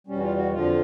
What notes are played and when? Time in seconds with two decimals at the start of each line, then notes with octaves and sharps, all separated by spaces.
0.07 E2 B2 G3 C#4
0.17 F#4
0.22 F4
0.37 F#4
0.53 F2 D3 F3 F4